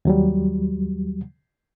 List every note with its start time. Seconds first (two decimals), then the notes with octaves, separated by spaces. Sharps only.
0.05 D#2 F#3 G3